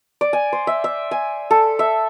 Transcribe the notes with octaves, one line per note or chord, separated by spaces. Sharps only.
D5
G#5
C5
E5
E5
G#5
A4
E5